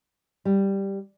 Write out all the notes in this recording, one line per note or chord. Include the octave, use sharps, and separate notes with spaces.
G3